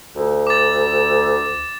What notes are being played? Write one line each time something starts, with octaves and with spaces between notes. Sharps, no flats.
D2
D6 A6